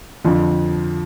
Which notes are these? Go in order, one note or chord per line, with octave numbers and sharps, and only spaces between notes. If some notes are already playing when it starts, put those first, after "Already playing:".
F2 D3 F3